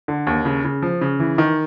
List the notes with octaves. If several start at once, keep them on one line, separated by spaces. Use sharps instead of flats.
D3
D#2
C#3
C#3
F3
C#3
E3
D#3